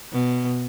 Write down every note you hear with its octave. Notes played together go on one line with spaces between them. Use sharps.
B2